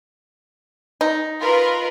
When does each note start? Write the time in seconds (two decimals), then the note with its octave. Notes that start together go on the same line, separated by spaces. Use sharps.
1.01 D#4
1.40 F4 A#4 B4